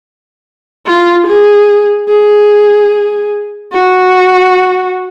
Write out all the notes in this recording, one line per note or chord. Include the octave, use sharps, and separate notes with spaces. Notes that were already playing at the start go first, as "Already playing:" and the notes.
F4
G#4
G#4
F#4